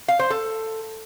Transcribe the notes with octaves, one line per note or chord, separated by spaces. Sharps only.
F5
C5
A4